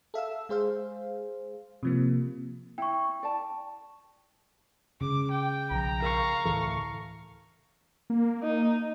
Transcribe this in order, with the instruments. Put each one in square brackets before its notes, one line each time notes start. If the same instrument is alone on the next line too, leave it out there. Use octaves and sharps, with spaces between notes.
[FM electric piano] A4 E5 F5 E6
G#3 G#4 C5 F5
C3 F3 A#3
[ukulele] E4 [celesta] G5 C#6
[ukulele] D5 A5
[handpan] C#3 [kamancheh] D6
[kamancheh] G5
[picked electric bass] B1 F3 [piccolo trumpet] A#5
[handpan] A#4 [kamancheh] F5 C#6
[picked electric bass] D2 A2 E3 [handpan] A4
[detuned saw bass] A#3
[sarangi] D#4